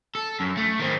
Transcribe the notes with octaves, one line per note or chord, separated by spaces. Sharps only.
A4
F#2
A3
D#3 C4